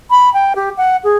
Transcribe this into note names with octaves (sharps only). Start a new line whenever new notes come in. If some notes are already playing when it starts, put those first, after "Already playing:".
B5
G5
G4
F#5
G#4